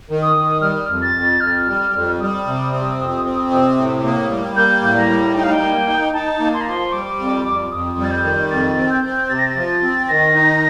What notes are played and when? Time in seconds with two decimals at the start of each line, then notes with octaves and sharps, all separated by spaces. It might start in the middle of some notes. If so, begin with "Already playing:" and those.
0.10 D#3
0.22 D#6
0.36 D#3
0.61 G3 F6
0.89 F2
1.02 A6
1.14 F2
1.41 F2 F6
1.67 G3
1.94 F2
2.20 G3 D#6
2.47 C3
2.72 C4
2.98 F2
3.25 C4
3.51 C3
3.77 A2
4.04 A#3
4.30 G3
4.56 A#3 G6
4.83 A2
4.96 A#5
5.08 G3
5.35 D#4 G5
5.43 F5
5.52 G5
5.61 A#3
5.87 D#4
6.14 D#4 A5
6.40 A#3
6.54 C6
6.61 A#5
6.66 F3 C6
6.92 G3 D6
7.19 F2
7.46 F2
7.71 F2 D#6
7.98 G3
8.04 A6
8.11 G6
8.24 D#3
8.51 F2 A6
8.77 C4
8.90 G6
9.04 C4
9.29 C3 A6
9.39 A#6
9.48 A6
9.57 F3
9.83 C4
10.08 D#3 A#6
10.35 D#4